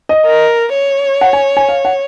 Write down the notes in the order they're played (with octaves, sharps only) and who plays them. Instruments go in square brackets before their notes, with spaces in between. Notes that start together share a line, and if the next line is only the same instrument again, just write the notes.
[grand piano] D#5
[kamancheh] A#4
C#5
[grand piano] F#5
G#5
G#5
F5
F#5